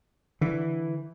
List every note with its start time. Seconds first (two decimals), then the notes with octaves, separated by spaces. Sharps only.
0.41 D3 E3